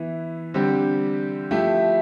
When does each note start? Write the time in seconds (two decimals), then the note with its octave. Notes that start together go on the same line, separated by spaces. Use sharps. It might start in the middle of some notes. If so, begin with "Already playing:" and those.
Already playing: E3 B3 E4
0.54 D3 G3 C4 G4
1.51 F3 A3 E4 G4